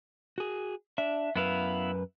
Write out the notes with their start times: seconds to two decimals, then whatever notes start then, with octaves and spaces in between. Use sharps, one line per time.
0.38 F#4 G#4
0.98 D4 E5
1.36 F#2 B3 E4 B4 F5